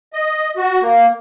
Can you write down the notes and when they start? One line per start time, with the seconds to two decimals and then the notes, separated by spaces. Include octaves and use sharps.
0.13 D#5
0.57 F#4
0.82 A#3